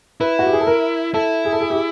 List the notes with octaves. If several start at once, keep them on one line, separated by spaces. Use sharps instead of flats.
E4 B4
F#4
G4
G#4
A4
A#4
E4 A4
G#4
A4
G#4
G4
G#4